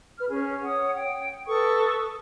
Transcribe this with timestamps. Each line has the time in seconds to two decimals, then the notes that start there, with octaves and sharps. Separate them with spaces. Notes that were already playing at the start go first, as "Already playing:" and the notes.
0.18 B4 F6
0.30 C#4 G#4
0.64 C#5 F#5 D#6
0.95 G5
1.46 A4 B4 C#6 D#6